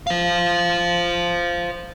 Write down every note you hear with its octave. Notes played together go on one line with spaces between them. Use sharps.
C5 F5